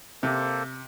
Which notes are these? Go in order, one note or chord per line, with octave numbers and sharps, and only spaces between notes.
C3 A#3 A4 C5